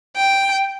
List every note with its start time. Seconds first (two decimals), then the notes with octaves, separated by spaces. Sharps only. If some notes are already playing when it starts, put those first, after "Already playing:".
0.17 G5